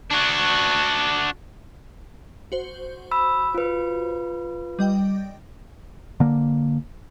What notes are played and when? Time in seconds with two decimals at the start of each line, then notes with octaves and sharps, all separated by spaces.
0.11 D4 F#4
2.52 F#4 C5
3.11 B5 E6
3.55 F4 B4
4.79 G3 D#5 G5
6.20 D3 A#3